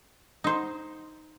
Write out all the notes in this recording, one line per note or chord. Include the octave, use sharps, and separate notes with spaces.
D#4 C5